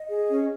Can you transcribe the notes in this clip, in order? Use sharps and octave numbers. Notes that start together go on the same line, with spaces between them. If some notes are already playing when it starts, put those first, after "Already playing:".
Already playing: D#5
G#4
C#4